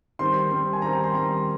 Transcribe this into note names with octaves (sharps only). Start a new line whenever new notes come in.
D#3 G3 C4 C6
D#3 G3 C4
G#5
D#3 G3 C4 A#5
A#5
C6
D#3 G3 C4 A#5